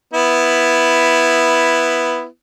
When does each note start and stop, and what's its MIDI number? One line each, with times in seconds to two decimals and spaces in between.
0.14 2.26 59
0.14 2.26 64